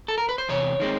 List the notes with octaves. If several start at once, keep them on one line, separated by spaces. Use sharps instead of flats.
A4
A#4
B4
C5
E2 C3 C#5
D#3 G#3 C4